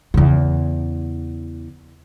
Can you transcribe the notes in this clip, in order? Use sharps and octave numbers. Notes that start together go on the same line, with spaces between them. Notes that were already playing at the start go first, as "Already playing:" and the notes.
E2 C#3